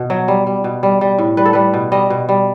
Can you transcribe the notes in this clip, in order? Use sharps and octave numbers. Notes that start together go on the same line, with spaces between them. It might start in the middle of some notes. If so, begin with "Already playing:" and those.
Already playing: B2
F#3
G3
G3
B2
G3
G3
A2
G3 B4
A4
G3 B4
B2
G3 D#5
B2
G3